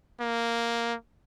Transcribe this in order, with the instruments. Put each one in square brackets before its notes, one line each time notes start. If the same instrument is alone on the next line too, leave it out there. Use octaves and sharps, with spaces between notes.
[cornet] A#3